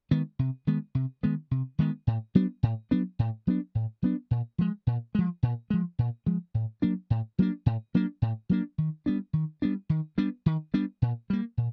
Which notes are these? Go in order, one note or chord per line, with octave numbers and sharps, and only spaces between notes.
D#3 G#3 B3
C3
D#3 G#3 B3
C3
D#3 G#3 B3
C3
D#3 G#3 B3
A2
F#3 B3 D4
A2
F#3 B3 D4
A2
F#3 B3 D4
A2
F#3 B3 D4
A#2
F3 G#3
A#2
F3 G#3
A#2
F3 G#3
A#2
F3 G#3
A2
F#3 A#3 D4
A2
F#3 A#3 D4
A2
F#3 A#3 D4
A2
F#3 A#3 D4
D#3
G3 B3 D4
D#3
G3 B3 D4
D#3
G3 B3 D4
D#3
G3 B3 D4
A#2
G3 A#3
A#2